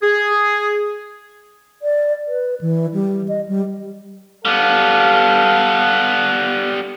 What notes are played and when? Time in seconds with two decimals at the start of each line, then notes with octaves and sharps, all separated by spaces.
0.02 G#4
1.82 D5
2.28 B4
2.61 E3
2.94 G3
3.28 D#5
3.48 G3
4.45 G3 B3 A4 F5